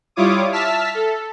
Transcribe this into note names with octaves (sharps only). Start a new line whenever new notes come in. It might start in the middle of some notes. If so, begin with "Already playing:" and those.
G3 E4 F4 C#5 D6 D#6
E5 A5 E6 F6 B6
A4